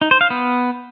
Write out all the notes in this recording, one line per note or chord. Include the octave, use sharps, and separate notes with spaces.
D#4
C5
F5
B3